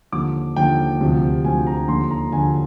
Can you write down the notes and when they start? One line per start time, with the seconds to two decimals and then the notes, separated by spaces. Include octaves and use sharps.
0.12 D#2 D3 F3 D6
0.56 D#2 D3 F3 G5
1.00 D2 C3 F3
1.44 D2 C3 F3 G#5
1.67 A#5
1.88 D#2 D3 F3 C6
2.11 A#5
2.32 D#2 D3 F3 G#5